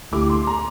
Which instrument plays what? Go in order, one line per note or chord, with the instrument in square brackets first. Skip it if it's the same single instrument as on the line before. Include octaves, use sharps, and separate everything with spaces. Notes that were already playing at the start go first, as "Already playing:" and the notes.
[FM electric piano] D2 D3 A3 E4 G4 [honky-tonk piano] D6
[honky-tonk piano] C6
A#5